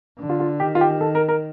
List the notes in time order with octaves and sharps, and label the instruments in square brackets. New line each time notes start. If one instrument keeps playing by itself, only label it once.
[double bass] D3
[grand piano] F4
F4
[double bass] D#3 [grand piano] G4
[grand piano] F4
G4
G4
A4
A#4
A#4